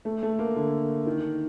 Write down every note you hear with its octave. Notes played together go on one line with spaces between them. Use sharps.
A3
A3
A#3
D3
D#3